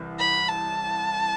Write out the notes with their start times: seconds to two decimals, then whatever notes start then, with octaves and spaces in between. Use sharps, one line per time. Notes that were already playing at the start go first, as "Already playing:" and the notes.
Already playing: C2 C3 E3
0.20 B5
0.48 A5